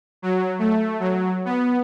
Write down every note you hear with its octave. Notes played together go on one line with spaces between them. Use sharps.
F#3
A3
F#3
B3